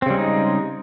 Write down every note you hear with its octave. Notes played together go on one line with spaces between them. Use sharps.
C#3 G3 G#3 C4 D#4